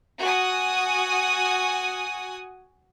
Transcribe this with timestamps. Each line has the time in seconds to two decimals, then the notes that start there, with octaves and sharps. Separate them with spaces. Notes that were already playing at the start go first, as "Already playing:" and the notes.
0.21 F#4 G#5 D#6